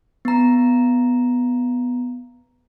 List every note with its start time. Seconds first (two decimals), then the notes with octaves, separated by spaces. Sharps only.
0.25 B3 A#5